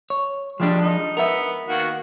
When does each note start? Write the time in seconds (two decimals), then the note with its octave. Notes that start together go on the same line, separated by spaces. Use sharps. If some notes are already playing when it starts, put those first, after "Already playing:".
0.10 C#5
0.60 F3 G3 G#3 D4
0.82 D#4
1.17 B3 A#4 E5
1.68 D#3 A#3 F#4